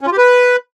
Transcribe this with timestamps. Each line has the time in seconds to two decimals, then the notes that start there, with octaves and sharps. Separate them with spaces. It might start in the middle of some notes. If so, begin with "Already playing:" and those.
0.01 C#4
0.07 F4
0.12 G4
0.18 B4